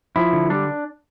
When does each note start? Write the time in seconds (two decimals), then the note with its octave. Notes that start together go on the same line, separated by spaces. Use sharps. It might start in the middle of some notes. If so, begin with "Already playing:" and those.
0.16 F3 E4
0.33 D3
0.50 G3 D4